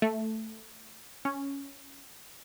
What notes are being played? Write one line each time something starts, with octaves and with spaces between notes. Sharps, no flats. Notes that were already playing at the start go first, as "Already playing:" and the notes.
A3
C#4